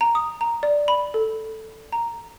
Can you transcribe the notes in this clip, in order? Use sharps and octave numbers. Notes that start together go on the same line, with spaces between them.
A#5
D#6
A#5
D5
B5
A4
A#5